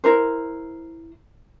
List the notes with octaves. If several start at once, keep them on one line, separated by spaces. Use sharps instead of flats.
E4 A#4 C5